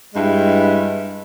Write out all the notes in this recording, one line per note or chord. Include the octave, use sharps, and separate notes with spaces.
G2 G#3 E4